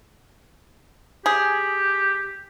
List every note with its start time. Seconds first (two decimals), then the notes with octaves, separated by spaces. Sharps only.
1.26 G4 G#4